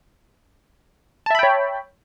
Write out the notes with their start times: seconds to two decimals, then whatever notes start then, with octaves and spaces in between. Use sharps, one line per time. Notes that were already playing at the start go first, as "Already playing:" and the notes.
1.26 A5
1.31 E5
1.35 B5
1.39 G5
1.43 C#5